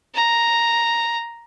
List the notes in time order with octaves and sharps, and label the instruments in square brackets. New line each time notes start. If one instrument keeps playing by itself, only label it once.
[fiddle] A#5